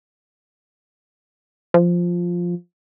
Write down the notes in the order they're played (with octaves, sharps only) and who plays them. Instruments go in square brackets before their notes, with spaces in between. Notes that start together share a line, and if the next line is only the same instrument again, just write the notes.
[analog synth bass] F3